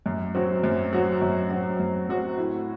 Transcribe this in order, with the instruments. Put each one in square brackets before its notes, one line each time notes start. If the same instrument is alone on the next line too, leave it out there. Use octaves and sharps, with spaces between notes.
[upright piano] F#2
F#3 C4 F#4
F#2
F#3 C4 F#4
F#2
F#3 C4 F#4
F#2
F#3 C4 F#4
A2